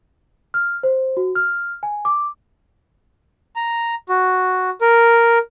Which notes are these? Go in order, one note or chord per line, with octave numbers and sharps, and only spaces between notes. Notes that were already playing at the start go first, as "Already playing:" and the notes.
F6
C5
F#4
F6
G#5
D6
A#5
F#4
A#4